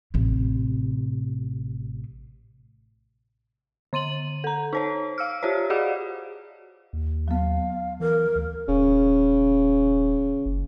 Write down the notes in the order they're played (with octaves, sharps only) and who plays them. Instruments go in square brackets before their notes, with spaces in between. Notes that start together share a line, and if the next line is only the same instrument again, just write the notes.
[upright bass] A1 C3
[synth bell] D3 C6 D#7 F#7
A4 A#5
D#4 C5 C#5
F5 E6 F6
F4 G4 C5 C#5
F#4 G#4 D5 F5 F#5
[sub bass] D#2
[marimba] F#3 B3 [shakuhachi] F5
[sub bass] E3 [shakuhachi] A#4
[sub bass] D2
[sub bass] D#1 [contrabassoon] C#3
[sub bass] F#1